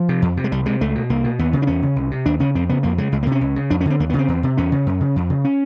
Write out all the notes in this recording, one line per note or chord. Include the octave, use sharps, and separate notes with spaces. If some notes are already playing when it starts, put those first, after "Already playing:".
Already playing: F3
C3
F2
C3
G#3
C2 G3
C3 G#3
C#2 A3
B2
C2 A#3
B2
D#2 B3
C#3
D4
E2 C#4
C#3
C2
C3
D#2 D4
C#3 C#4
F2 C4
C#3 B3
F2 A#3
C#3 G#3
C#2 G#3
A#3
C3
C#4
C#2
C#3
F2 D4
C#4
D3 C4
D#2 A#3
B3
C#3
C4
E2
C3
E2 C#4
C#3
F#2
C#3
F2
C#3
C#4